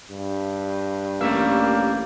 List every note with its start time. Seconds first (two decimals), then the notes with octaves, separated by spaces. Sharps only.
0.11 G2
1.20 A1 G3 A#3 C#4 E5